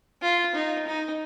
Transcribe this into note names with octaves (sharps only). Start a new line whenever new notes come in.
F4
D#4
D#4